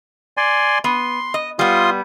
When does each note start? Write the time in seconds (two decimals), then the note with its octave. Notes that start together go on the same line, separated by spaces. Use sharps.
0.37 D5 G#5 C6
0.84 B3 C6
1.34 D#5
1.59 G3 B3 F4 C6 D#6